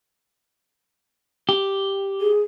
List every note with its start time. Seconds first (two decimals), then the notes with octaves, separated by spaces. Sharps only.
1.49 G4
2.21 G#4